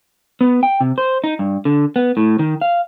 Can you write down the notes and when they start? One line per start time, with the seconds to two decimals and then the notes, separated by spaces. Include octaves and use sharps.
0.41 B3
0.63 G5
0.81 C3
0.98 C5
1.24 D#4
1.39 G2
1.65 D3
1.96 B3
2.17 A2
2.39 D#3
2.61 F5